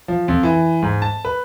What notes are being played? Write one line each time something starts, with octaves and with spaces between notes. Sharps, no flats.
F3
F2
E3
G#2
A5
B4